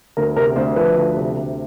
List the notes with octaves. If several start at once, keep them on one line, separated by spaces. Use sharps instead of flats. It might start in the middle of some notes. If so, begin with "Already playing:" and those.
D2 A#4
C3 A#4
D2 C5
F3 B4
D2
C3
D2